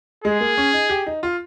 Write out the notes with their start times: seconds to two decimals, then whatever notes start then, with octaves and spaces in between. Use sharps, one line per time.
0.24 G#3 G#4
0.41 A#3
0.57 C#4
0.73 D#4
0.89 G4
1.06 D#4
1.23 F4